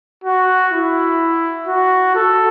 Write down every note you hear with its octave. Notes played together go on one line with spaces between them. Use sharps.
F#4
E4
F#4
A4